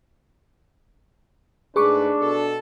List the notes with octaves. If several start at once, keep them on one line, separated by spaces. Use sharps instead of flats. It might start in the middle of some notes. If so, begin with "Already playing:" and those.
G#2 A3 D4 G#4 B4 C#6 D6
B2 A4